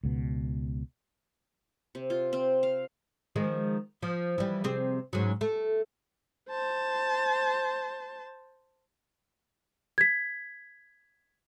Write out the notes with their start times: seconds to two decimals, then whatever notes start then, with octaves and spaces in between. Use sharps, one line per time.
0.03 C#2 B2
1.95 C3
2.10 F4
2.33 C4
2.63 F5
3.36 D#3 F3 G#3
4.03 F3
4.38 E3 G3
4.64 C3 C4 G#4
5.13 G#2 C#3 F#3
5.41 A3
6.49 C5 A5
9.98 G#6 B6